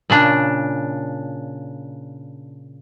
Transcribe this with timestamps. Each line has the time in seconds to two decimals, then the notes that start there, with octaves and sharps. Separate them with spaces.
0.10 A#2 C#3 D4